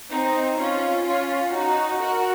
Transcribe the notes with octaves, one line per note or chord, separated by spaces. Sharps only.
C4 D#4
C#4 F4
C#4 F4
D#4 F#4
F#4 A#4